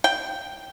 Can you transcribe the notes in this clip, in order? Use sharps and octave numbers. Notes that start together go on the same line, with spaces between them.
G5